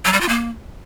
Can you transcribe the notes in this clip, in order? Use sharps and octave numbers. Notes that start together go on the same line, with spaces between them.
F#3
G3
F4
A#3